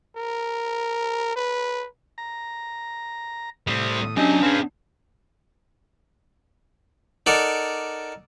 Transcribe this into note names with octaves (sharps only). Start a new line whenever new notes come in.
A#4
B4
A#5
A2 G3 C4 D#6
F#3 C#4 D4 G4 D#5
C4 G#4 B4 F5 G5
D#4 A4 A#4 D5 F#5